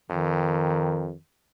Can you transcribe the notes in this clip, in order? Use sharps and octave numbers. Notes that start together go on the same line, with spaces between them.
F2 D#3